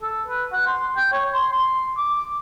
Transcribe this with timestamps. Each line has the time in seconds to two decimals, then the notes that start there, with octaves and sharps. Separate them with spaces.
0.02 A4
0.28 B4
0.52 F#5
0.66 C6
0.97 G5
1.12 C#5
1.33 C6
1.52 C6
1.98 D6